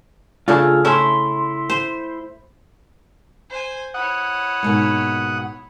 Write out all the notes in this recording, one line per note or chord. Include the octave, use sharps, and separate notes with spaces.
C#3 A3 D4 F4 G#4 E6
A3 C#4 E4 E5 C6
C5
C5 G#5
E4 C#5 F#5 D#6
G#2 B2 A#3